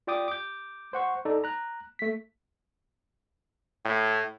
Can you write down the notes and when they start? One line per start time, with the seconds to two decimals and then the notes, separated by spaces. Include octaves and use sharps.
0.07 F4 D5 G5 D6 D#6
0.28 D6 G6
0.93 C5 F#5 C#6
1.25 D#4 A4 D5
1.44 A#5 F#6
1.99 A3 B6
3.85 A2